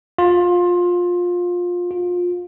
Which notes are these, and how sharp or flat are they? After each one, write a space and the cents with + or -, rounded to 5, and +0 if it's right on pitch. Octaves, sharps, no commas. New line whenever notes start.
F4 +20
F4 +25